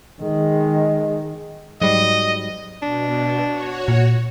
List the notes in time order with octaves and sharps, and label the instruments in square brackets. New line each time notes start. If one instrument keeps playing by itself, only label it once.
[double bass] D#3 [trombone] G#3
[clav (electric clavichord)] G#2 G3 [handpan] F#3 [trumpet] D#5
[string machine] B2 [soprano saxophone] D4
[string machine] F#4 C#5
[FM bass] A#2